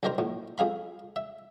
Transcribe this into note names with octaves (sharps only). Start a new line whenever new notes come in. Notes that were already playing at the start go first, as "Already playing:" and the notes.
B1 G2 D#3 A#4 C5 A#5
A#1 A2
F2 G#4 F5 B5
E5